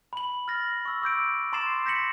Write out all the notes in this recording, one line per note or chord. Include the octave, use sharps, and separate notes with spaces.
B5 F#7
F6 A6 A#6
C#6 E6
D6 E6 G6 D7
A#5 C6 D6 A6 C7 E7
G6 A#6 B6 C#7 F#7